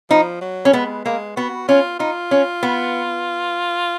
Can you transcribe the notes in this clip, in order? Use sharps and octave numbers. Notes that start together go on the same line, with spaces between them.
F3 D#4
F#3
C#4
G#3 B3
G#3 A#3
B3 F#4
C#4 F4
D#4 F4
C#4
B3